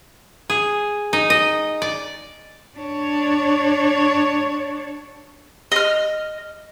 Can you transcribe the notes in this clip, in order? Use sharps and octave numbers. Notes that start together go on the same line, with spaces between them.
G#4
D#4
D#5
D5
D4 C#5
D#5 F6